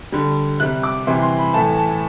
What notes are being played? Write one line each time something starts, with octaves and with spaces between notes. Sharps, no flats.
D3 G3
C3 G3 F#6
D6
C3 E3 G3 C6
C6
B5
A2 E3 A3 A5
A5